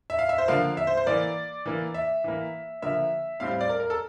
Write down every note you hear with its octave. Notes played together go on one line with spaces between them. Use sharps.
E5
F5
E5
C5
D3 F3 A#3 F5
E5
C5
C5
E3 A#3 D5
E3 A#3
E5
E3 A#3
D3 F3 A#3 E5
A2 G3 C4 F5
F5
D5
A#4
A#4
A4